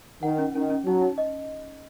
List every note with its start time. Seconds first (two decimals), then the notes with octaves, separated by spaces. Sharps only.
0.23 D#3 F#5
0.38 C#4
0.55 D#3 C#4
0.70 C#4
0.86 F#3 D#4
1.02 D#4
1.18 D#5